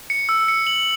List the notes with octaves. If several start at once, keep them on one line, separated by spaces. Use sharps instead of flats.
C#7
E6
C#7
F#7